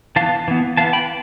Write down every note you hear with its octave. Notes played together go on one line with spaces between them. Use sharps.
E3 B3 F5 A5
E3 B3
E3 B3 F5 A5
G5 B5